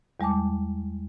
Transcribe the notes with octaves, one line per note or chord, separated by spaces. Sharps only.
E2 G3 G#3 A5 D6